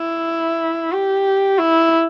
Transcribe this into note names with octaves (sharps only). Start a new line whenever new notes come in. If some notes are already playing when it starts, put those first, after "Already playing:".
Already playing: E4
G4
E4